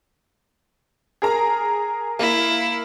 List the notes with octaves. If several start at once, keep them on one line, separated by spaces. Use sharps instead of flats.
G#4 A#4 A#5
A#3 E4